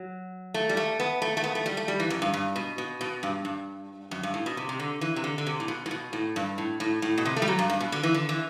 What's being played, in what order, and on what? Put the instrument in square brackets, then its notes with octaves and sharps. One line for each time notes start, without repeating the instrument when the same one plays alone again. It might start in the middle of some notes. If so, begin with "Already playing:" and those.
Already playing: [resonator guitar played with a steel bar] F#3
A3
G3
A3
B3
A3
A3
B3
A3
G3
A3
G3
E3
F#2
G2
G2
B2
B2
B2
G2
G2
F#2
G2
A2
B2
C3
C3
D3
E3
C3
D3
D3
C3
A2
B2
A2
B2
A2
G2
A2
A2
A2
B2
C3
A3
G3
F#3
G2
G2
B2
D3
E3
D3
E3